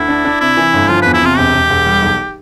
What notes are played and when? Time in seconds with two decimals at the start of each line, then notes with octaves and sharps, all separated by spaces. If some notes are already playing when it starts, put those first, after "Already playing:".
Already playing: D2 E4
0.09 D4
0.25 D4
0.40 C3 E4
0.57 E3
0.74 G1
0.89 F3 F4
1.02 E2 B4
1.14 E4
1.22 C3 F4
1.38 E1 G4
1.54 E1
1.70 E1
1.86 G3
2.03 B1